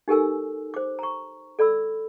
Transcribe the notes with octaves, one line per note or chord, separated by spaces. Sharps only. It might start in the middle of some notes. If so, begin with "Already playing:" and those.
D#4 G4 A4 A#4 G#5 E6
C5 D6
A#5 C#6
A4 D5 B5 E6